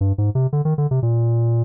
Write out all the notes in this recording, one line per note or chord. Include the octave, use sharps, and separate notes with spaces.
G2
G#2
C3
D3
D#3
D3
C3
A#2